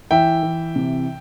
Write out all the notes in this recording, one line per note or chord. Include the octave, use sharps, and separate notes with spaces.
E3 E5 G5
E3
C3